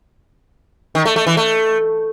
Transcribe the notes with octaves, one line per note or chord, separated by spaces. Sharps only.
D#3
A3
A3
E3
A3